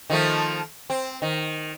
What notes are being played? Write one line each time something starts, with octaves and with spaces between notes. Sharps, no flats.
D#3 F3 A3
C4
D#3